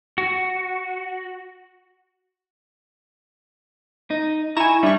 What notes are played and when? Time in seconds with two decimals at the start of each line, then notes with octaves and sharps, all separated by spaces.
0.18 F#4
4.10 D#4
4.57 E4 G#5 A#5 C#6 E7
4.83 G3 D4 E5 C#6